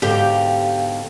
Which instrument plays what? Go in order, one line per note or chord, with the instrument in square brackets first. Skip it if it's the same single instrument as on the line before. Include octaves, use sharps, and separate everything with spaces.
[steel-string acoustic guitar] G#2 B2 D3 [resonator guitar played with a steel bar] G4 [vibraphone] F5 G5